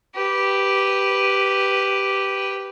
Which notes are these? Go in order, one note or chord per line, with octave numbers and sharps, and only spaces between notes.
G4 B4